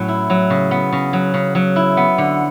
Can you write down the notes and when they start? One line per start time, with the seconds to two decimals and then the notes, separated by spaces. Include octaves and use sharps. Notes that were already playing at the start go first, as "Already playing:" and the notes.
Already playing: A2 F#3 C#4
0.08 E4
0.30 F#3
0.50 C#3
0.71 B3
0.92 C#3
1.13 F#3
1.34 C#3
1.55 F#3
1.76 E4
1.97 B3
2.18 D3